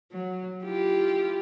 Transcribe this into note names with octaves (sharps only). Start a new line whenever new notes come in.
F#3
E4 F4 G4